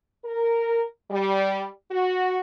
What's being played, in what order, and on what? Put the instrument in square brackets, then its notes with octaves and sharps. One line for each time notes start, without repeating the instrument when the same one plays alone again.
[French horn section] A#4
G3
F#4